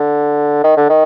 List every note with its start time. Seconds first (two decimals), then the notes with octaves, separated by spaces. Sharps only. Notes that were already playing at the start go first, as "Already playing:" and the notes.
Already playing: D3
0.64 D#3
0.77 D3
0.89 D#3